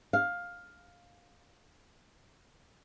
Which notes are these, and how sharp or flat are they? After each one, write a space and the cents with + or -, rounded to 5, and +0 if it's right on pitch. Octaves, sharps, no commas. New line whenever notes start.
F5 +10